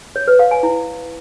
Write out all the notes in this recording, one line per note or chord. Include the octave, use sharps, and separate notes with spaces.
C#5
B4
F5
G#5
E4